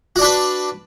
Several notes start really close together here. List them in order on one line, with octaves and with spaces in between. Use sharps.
F#4 D5 D4 B4